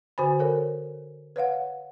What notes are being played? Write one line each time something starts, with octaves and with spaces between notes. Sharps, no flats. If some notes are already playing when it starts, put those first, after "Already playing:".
D3 F#4 C5 G#5 B5
A4 A#4 C#5
B4 C#5 F5 F#5